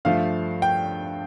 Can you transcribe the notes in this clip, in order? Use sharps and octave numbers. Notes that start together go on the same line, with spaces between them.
G2 F3 A3 F5
G5